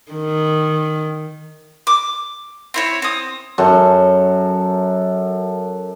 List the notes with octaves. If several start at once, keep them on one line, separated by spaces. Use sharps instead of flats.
D#3
D6
C4 E4 C#5
C4 D#6
F#2 A4